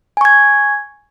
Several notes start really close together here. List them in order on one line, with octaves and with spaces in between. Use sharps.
G#5 C#6 G#6